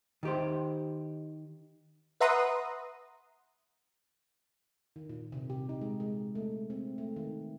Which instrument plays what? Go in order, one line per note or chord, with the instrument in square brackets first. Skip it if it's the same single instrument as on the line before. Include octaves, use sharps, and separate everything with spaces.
[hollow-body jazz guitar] D#3 G4 C5
[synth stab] B4 E5 F#5 A#5 C6 D#6
[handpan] D#3
A#2
C3
G4
D#4
G#3
G#3
A3
C4
A3
D#3